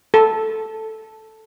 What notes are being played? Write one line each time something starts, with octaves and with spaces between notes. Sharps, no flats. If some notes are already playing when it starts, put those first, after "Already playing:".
A4